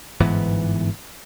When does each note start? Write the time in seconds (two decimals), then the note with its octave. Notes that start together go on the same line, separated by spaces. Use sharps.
0.20 G1 G#2 E3 B3